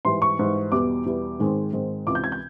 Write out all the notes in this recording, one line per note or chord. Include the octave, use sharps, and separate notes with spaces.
G#2 E3 G3 C6
C#6
G#2 E3 G3
E2 B2 G3 B3 E4 D6
E2 B2 G3 B3 E4
G#2 D#3 G#3 C4
G#2 D#3 G#3 C4
C#2 C3 E3 D6
G6
G#6
G6